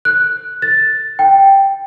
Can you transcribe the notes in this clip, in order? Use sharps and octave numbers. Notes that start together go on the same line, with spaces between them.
F#6
A6
G5